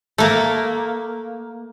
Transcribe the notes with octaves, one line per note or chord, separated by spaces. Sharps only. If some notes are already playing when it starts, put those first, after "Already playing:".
A3 A#3